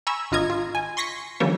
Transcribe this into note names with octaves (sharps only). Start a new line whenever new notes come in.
G#5 A#5 B5 C#6 E6
G#1 D3 F4 D#5 A#5 G#6
F4
G#5
C6 C#6 A#6 B6 C#7
D3 D#3 F3 G3 A#3 C#4